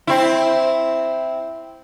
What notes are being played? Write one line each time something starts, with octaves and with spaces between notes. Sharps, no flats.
C4 E4